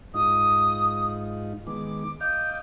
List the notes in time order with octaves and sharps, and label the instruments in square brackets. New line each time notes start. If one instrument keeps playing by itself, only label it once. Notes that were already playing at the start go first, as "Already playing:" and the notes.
[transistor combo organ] G#2 D#4 F4 [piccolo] D#6
[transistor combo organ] D#3 G#3 B3 [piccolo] D6
[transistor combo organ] D#5 F5 D6 [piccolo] G6